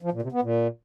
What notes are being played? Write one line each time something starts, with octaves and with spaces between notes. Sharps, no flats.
F3
A#2
C3
B3
A#2